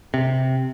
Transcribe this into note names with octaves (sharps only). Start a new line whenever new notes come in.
C3